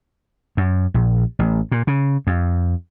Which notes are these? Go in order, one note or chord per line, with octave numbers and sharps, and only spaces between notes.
F#2
A#1
A1
A#2
C#3
F2